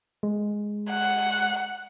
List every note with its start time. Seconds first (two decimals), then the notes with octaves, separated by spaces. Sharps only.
0.23 G#3
0.91 F#5